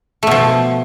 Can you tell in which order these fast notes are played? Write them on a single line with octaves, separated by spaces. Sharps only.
A3 B2 F3